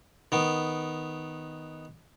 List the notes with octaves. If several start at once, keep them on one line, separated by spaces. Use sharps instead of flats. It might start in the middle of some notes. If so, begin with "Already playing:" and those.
D#3 B3